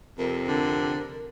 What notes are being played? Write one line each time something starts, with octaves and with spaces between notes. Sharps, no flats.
F2 C3 A#4
D3